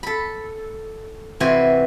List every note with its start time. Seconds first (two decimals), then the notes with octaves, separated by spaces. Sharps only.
0.03 A4 B5
1.40 C3 E3 F#4 C5 G#5